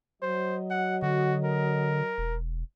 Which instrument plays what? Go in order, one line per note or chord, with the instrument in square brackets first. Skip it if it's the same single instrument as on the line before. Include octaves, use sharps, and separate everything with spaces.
[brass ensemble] F#3 D#5 [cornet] C5
[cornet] F#5
[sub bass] D3 [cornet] F#4
[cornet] A#4
[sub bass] E1